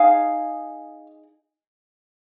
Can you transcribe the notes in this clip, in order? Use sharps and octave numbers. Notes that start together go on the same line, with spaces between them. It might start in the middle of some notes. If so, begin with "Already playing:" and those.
Already playing: D#4 G#4 F5 G#5